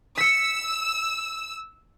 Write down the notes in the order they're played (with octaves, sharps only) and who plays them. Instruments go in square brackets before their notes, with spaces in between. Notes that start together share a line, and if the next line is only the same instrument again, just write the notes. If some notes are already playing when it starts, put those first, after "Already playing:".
[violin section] E6 [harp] B6 C#7